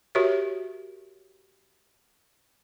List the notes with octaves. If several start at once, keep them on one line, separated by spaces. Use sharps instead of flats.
F#4 G4 A#4 C#5 E5